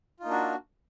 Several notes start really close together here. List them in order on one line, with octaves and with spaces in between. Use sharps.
F4 D#4 A#3 D4 F#4